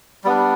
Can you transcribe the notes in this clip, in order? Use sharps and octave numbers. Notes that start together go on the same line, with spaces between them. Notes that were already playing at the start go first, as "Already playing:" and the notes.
G3 B3 D4